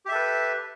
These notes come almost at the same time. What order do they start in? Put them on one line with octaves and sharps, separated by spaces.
G4 E5 A4 B4